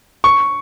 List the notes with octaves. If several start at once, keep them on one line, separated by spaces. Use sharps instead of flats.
C#6